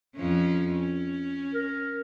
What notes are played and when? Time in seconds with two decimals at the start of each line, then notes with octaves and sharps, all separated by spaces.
0.16 F2 F3 C#4
0.74 C#4
1.54 A#4